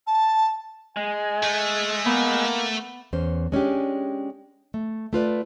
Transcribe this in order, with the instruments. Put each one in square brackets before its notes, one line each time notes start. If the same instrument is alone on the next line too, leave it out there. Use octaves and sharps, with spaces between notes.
[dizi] A5
[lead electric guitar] G#3 [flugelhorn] G#5
[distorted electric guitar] A3
[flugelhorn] A#3 [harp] B3
[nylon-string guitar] E2 C#4 C5
G#3 C#4 D4 G4
A3
A3 F4 B4 D5